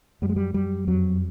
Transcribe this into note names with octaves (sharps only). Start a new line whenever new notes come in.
F#2 G3
G#3
G3
F#2 G3
F2 F#3